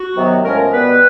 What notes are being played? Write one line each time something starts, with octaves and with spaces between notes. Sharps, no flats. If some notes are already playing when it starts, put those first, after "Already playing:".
Already playing: F#4
C3 D#3 F#3 B3
A2 F3 G#3 C#4 A#4
A#4
B2 G3 B3 B4